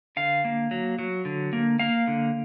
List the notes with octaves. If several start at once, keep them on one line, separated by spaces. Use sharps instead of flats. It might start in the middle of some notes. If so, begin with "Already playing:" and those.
D3 F5
A#3
F#3
F#3
D3
A#3
A#3 F5
D3